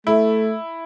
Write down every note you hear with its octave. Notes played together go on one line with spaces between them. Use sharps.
A3 E4